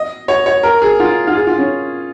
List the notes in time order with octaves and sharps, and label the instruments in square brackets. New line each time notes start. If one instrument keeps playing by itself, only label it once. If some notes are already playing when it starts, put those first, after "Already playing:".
Already playing: [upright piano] D#5
C#5
C#5
A#4
G#4
F4
F4
G#4
F4
C#4